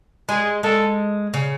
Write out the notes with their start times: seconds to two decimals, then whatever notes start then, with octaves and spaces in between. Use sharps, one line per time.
0.29 G#3 G#4
0.63 G#3 A4
1.34 C#3